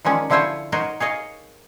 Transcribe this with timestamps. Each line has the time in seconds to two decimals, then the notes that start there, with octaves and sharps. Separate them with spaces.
0.05 D#3 F3 G#3 C#4 D5
0.30 D3 F3 E4 F4 C5 C#5
0.72 D#4 F#4 A#4 C5 C#5 D#5
1.00 G#4 C#5 D#5 F5